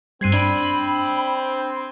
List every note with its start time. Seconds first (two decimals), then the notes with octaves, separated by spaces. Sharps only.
0.21 G2 G3 C4 G#6 C7 D#7
0.33 D4 B5